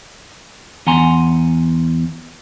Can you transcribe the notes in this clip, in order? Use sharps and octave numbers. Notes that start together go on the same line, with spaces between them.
E2 F#5 G#5 A#5 C6